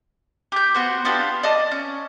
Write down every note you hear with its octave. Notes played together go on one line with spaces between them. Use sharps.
G4 G6
B3 F#4 C5
B3 D4 F4 G4
D5 D#5 A5
C#4